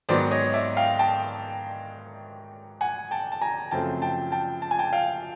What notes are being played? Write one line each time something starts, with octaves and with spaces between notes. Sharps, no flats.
G#2 D#3 F#3 B3 C5 D5
C#5 D#5
D5 E5
F5 G5
G5 A5
F#5 G#5
G5 A5
A5
G#5 A#5
F#2 C#3 F3 A3 C4 G5 A5
G5 A5
G5 A5
A5
G#5
G5 A5
F5 G5